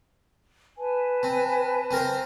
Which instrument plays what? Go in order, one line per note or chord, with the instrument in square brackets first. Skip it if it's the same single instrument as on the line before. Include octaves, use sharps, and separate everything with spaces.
[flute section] B4 G#5 A5
[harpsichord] C4
C4 A#4 C5